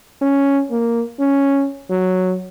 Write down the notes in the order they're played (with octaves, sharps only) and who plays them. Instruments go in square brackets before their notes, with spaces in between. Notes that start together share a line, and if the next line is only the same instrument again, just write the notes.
[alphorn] C#4
A#3
C#4
F#3